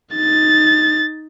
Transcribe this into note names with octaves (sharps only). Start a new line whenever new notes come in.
D#4 A6